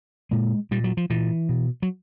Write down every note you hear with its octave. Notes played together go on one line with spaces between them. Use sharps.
A#2 G#3
A#2 G3
F#3
F3
A#2 E3
B2
F#3